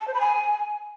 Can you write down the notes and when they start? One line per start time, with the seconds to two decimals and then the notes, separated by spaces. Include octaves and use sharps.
0.01 A5
0.07 C5
0.14 B5
0.20 G#5